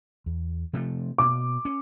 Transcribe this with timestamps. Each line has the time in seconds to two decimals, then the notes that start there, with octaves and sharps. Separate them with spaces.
0.26 E2
0.73 C3 F3 A3
1.18 B2 D6
1.65 C#4